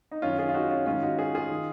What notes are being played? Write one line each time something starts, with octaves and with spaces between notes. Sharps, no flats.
D#4
F#2 D#3 C#4 F4
F4 G#4
F4
D#4 F#4
C#4 F4
G#2 D#3 C#4 F4
D#4 F#4
F4 G#4
F4 G#4
D#3